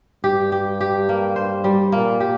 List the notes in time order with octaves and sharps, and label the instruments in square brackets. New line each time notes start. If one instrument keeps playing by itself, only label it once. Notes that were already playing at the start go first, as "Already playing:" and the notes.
[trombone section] G2 [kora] G4
[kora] G4
G4
A#3
C5
G3
[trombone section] A#2 [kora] A#3
[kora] G4